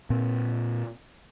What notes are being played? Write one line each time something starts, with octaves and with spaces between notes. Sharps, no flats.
A#2 C4